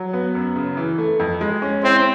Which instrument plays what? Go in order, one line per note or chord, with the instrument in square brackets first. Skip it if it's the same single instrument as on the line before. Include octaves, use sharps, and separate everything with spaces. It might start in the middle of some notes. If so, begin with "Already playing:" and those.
Already playing: [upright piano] F#3
B3
F#2
C#3
E3
A3
F2
G#3
C#4
[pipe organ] C4 [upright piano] E4